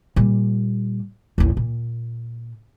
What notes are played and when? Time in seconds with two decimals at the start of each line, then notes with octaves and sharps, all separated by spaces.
0.16 A#2 G3
1.38 A1 D#2
1.57 A#2